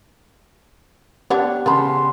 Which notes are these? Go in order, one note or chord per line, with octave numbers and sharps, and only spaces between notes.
B3 D4 G4 C#5 F#5
C#3 B3 A5 B5 C6